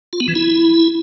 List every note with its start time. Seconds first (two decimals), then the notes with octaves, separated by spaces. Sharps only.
0.13 F4
0.20 B3
0.28 E3
0.35 E4